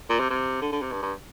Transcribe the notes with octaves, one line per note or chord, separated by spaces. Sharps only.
A#2
C3
C3
D3
D3
C3
G2
G2